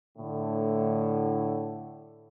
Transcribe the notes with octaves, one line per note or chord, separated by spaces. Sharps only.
A2 D3